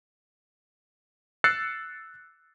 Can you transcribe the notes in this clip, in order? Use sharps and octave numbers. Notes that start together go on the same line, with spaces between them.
E6 F#6 A6 C7 C#7